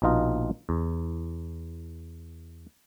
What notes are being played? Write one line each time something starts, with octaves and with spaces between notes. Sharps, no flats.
A#1 B2 D#4 F4 D#5
E2